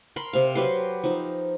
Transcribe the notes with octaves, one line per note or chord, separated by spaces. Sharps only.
A#4 B5 C6
C3 C4 F5
F#3 G4 B4 C6
F3 D#4